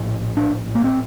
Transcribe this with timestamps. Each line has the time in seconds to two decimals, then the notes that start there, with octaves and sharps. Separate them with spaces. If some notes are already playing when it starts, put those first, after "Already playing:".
Already playing: A#1 A2
0.37 D4
0.75 A#3
0.84 C4